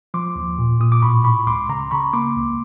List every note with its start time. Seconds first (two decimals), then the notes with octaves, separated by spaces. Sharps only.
0.14 F3 C6 D6
0.36 D#2
0.58 A#2
0.80 A#2 D#6
0.92 D6
1.02 A2 B5 C#6
1.24 A2 B5 C#6
1.47 C#2 C6 D6
1.70 C#3 A#5 C6
1.91 C#3 B5 C#6
2.13 A#3 C6 D6
2.36 C#2